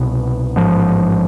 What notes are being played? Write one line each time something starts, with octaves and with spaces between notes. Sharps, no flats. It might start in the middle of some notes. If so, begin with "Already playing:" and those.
Already playing: C2 B2 B3
A1 G#2 F3